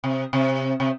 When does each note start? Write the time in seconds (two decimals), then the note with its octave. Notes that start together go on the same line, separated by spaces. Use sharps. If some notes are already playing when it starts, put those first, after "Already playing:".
0.04 C3
0.33 C3
0.80 C3